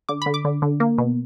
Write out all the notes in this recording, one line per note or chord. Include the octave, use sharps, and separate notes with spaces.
D3 D6
D3 B5
D6
D3
D3
A#3
B2